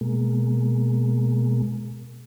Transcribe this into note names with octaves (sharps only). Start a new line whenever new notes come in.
B2 G#3 A#3